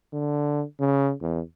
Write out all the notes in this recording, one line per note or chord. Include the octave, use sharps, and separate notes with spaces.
D3
C#3
E2